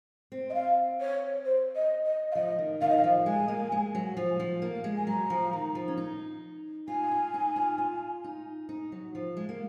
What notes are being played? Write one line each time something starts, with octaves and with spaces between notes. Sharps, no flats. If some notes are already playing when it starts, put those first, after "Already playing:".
C4
D#5
F5
C#5
C5
D#5
D#5
F5
F3 D#5
D#3
D#3 F5
D#5
F5
F3
G#3 G#5
A#3
G#3
F#3
F3
F3
A#3
G#3
G#5
F#3 A#5
F3
D#3
F3
C#4
D#4
F4 G#5
F4
D#4
F4
F4
D#4
D#4
F#3
F3
G#3
A#3